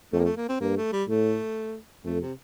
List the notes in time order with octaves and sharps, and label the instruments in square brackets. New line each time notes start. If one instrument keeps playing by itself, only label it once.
[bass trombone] F2 [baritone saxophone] A3
[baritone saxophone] A#3
A3
A#3
C4
[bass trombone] G2 [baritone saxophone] A#3
[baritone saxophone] A3
G3
[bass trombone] A2 [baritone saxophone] A3
[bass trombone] F2 [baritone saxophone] A3
[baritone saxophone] C3